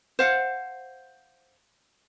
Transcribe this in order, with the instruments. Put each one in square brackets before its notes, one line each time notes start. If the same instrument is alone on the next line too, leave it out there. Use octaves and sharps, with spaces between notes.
[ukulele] C5 F5 F#5